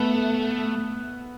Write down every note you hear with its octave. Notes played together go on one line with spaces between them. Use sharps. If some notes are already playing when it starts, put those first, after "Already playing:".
Already playing: A3 B3 A4 B4